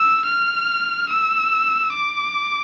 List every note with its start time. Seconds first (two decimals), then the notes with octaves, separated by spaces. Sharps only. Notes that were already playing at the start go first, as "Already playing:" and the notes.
Already playing: E6
0.25 F6
1.09 E6
1.93 D6